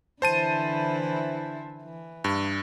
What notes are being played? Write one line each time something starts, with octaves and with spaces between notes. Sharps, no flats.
D3 E3 E4 C5 A5 D#7
E3
G2